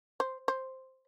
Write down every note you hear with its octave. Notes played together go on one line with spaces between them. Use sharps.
C5
C5